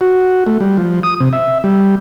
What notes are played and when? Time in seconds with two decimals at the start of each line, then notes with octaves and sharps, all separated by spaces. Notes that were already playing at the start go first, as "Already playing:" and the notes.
0.01 F#4
0.47 A3
0.60 G3
0.77 F3
1.03 D#6
1.20 C3
1.33 E5
1.64 G3